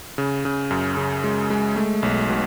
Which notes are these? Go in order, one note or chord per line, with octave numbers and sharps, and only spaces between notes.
C#3
C#3
F#2
C#3
G#3
G#3
A3
B1
B2